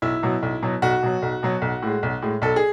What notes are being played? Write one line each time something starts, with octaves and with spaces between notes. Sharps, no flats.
B1 E4
B2 F#3
B1
B2 F#3
B1 F#4
B2 F#3
B1
B2 F#3
B1
A2 G#3
B1
A2 G#3
B1 A4
G#4